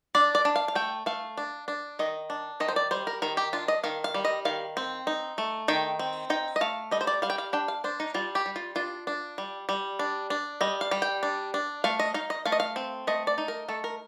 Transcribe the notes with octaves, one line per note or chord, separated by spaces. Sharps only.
D4 D5
D5
D4
F5
F5
A3 G5
A3 F5
D4
D4
D#3 D#5
D4
D#3 D#5
C5
D5
G3 C5
A#4
D#3 A#4
G4
D4 F4
D#5
D#3 F5
F5
G3
D#5
D#3 F5
C4
D#4
A3
D#3 G5
C4
D#4 G5
D#5
A3 F5
G3 D#5
C5
D5
G3 F5
G5
F5
D4 G5
F5
D4 C5
D#4
G3 F4
G4
G3
F4
D4 F4
D4
G3
G3
D4
D4
G3 D#5
F5
G3
G5
D4
D4
A3 F5
D#5
D#4 F5
D#5
A3 F5
D#5
F5
C4
A3 D#5
D5
D#4
A#4
A3 A4
A#4